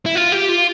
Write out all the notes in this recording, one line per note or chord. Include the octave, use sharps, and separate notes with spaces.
E4
F4
G4
F4